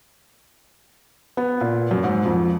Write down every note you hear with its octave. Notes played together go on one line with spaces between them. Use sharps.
B3
A#2
F#2
G#2
F2